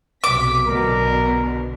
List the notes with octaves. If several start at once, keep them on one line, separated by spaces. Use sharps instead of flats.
B1 C3 D6 B6
B1 B2 D3 A#4